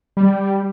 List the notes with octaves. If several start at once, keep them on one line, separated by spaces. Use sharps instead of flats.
G3